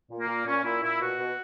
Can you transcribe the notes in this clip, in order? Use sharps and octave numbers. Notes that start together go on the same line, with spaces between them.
A#2
A#3
A#2
A#2 C#4
A#2 E4
A#2 E4
B2 F#4
B2